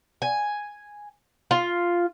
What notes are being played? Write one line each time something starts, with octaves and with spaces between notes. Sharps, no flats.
G#5
F4